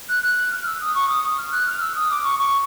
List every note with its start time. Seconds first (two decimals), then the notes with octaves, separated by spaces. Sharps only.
0.09 F#6
0.23 F#6
0.51 F6
0.66 E6
0.81 D#6
0.95 C#6
1.09 D#6
1.24 D#6
1.38 F6
1.52 F#6
1.67 F6
1.81 E6
1.95 D#6
2.10 D6
2.24 C#6
2.39 C#6